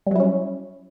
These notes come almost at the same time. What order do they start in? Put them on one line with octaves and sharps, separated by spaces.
G3 F#3 E4 C#4